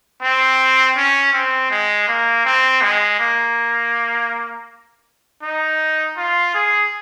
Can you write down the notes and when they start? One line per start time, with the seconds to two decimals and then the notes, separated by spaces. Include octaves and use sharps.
0.22 C4
0.96 C#4
1.33 C4
1.71 G#3
2.08 A#3
2.45 C4
2.82 G#3
3.20 A#3
5.43 D#4
6.17 F4
6.55 G#4